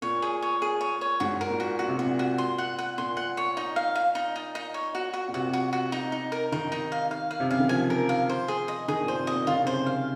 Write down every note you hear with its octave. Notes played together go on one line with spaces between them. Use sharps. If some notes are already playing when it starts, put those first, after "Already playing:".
A#2 C#5
G#4
C#5
G#4
C#5
C#5
G#2 F#4
A#4
A#2
F#4
A#2 F#4
C3
A#2 F#4
F#4
C6
F#5
F#5
A#2 C6
F#5
C#5
D#4
F5
F5
D#4
D#4
D#4
C#5
F#4
F#4
A#2
C3 F#4
F#4
F#4
D#4
D#4
A#4
D#3 D#4
D#4
F5
F5
F5
C3
C#3 F5
D#3
F3 G#5
A#4
F5
C5
G#4
D#5
D#3 G#4
A#2
C5
C3
A#2 D#5
D#3 F4
C#3
C3
C#3 C5
F5